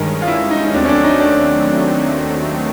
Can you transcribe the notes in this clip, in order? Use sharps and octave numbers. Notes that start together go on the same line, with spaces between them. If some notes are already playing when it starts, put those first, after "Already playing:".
Already playing: G2 D#3 G#3 C#4 A#4
F4
E4
D#4
D#4
D#2 D#3 F#3 A3 C4 D4
C#4
D4
D#4
D4